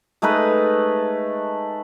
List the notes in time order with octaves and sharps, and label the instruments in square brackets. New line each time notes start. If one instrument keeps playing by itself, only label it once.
[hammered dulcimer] G#3 A3 D#4 B4